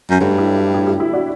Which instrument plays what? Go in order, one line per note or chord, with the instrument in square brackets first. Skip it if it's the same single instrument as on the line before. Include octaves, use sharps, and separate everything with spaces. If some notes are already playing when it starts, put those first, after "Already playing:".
[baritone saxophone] F#2
[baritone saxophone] G2 [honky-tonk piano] F#3 A3
[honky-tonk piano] E4 G4
E4 G4
E4 G4
E4 G4
D4 F#4